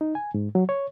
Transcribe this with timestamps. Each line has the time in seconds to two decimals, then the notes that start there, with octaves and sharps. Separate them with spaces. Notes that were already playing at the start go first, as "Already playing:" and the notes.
0.01 D#4
0.15 G#5
0.34 G#2
0.55 F#3
0.69 C#5